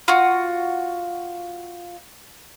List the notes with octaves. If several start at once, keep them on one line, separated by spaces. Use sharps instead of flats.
F4 F#4